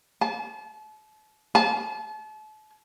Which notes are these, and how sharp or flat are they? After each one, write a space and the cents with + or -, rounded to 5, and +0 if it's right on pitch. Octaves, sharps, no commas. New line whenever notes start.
A5 -35
A5 -35